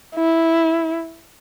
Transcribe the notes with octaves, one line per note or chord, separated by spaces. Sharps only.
E4